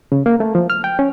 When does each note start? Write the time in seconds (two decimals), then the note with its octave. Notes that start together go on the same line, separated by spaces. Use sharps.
0.12 C#3
0.26 A#3
0.40 A3
0.55 F3
0.70 F6
0.84 G5
0.99 C#4